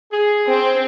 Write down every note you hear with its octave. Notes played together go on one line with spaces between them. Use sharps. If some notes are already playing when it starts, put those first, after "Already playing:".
G#4
C4